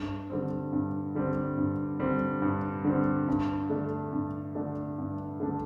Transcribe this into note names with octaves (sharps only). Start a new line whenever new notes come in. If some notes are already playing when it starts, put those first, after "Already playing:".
Already playing: G2
D3 G3 C4
G2
D3 G3 C4
G2
D3 G3 C4
G2
D3 G3 C4
G2
D3 A3 D4
G2
D3 A3 D4
G2
D3 A3 D4